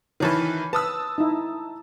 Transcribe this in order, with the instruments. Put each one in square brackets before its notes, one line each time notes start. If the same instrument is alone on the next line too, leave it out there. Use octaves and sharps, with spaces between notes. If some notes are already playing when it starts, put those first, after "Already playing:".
[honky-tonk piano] D#3 E3 B4 [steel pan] A#4 C#5 A5
[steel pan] B4 [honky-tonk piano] A5 D#6 E6
[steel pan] D#4 E4